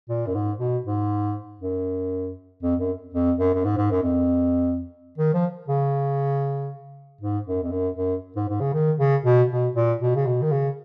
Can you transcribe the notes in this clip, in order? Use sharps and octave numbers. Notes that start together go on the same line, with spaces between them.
A#2
F#2
G#2
B2
G#2
F#2
F2
F#2
F2
F#2
F#2
G#2
G#2
F#2
F2
D#3
F3
C#3
G#2
F#2
F2
F#2
F#2
G#2
G#2
C#3
D#3
C#3
B2
B2
A#2
B2
C#3
B2
D#3
C#3